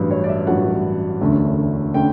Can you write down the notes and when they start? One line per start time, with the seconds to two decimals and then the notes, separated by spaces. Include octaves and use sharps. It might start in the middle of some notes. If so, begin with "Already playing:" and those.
Already playing: A1 G2 F#3 B4
0.11 C#5
0.24 D5
0.29 E5
0.47 A1 G2 F#3 F#5
1.21 E1 D2 D3 A3 C#4
1.94 D3 A3 C#4 G5